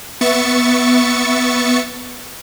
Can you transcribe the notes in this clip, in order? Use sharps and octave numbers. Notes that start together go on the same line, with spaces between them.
B3 E5 C#6 A6 C#7